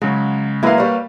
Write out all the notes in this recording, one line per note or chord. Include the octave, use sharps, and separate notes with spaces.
C#3 F#3 G#3
F#3 G#3 A#3 E4 B4 F5
G3 C#5